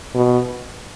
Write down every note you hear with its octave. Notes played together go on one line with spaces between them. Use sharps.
B2